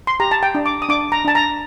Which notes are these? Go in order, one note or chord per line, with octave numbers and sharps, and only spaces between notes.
C6
G4 A#5
A5
G5
D4
D6
D#6
D4 D6
A#5
D4 A5
A#5